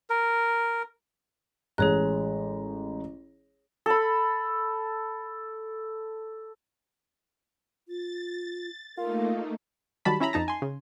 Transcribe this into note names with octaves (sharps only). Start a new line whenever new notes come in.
A#4
A1 G#3 G#4 C#5 A#5 F#6
A4 B5
F4 A6
A3 A#3 D#4 F4 A#4
D#3 F#3 G3 A5 B5
C#4 E4 E5 A#5 B5
F2 D#4 A5 A#5
G#5 C6
C#3